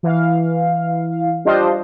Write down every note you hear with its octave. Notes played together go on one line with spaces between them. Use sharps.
E3 F5
G3 D4 F4 C5 D#5